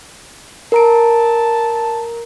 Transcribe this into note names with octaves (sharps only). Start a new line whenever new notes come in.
A#4 A5 A#5 D7